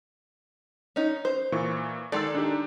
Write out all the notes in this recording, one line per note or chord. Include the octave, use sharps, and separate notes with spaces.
C#4 D#4
C5
A#2 E3 C#6
D#3 G#3 A4 D5 C6 E6
D4 D#4 G4